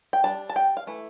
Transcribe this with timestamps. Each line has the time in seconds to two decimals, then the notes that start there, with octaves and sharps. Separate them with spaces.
0.13 G5
0.24 G3 D4 A5
0.49 A5
0.56 G5
0.77 F5
0.87 E3 A3